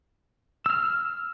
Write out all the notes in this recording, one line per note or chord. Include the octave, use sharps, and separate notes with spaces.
E6 F6